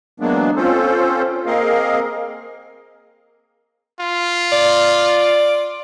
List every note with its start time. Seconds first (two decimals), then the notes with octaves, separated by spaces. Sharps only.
0.20 E3 F#3 G#3 A#3 B3 D4
0.56 C4 C#4 F4 A4 C5
1.46 A#3 C4 G#4 A#4 D#5 F5
4.01 F4
4.52 D5